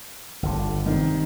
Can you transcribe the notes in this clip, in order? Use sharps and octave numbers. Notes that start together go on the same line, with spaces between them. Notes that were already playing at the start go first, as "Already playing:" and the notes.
G1 D3
C3 D#3